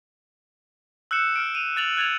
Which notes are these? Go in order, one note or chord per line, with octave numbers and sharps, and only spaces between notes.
E6 F#6 G6 C#7 E7
F6 D7
D#7 F7
F#6 A6 F7 F#7
F#6 G#6 A6 F7